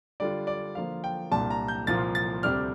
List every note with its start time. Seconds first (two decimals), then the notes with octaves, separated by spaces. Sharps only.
0.20 D3 G3 D4 F4 D5
0.47 D5
0.75 D3 F3 A#3 F4 F5
1.04 G5
1.31 C2 A#2 G3 D4 A5
1.50 A#5
1.68 G6
1.87 C2 A#2 F3 A#3 F4 A6
2.15 A6
2.43 D2 C3 G3 D4 F6